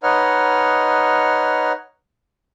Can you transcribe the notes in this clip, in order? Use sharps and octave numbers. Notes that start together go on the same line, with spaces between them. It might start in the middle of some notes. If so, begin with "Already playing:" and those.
D#4 B4 C#5 D#5 F#5 F6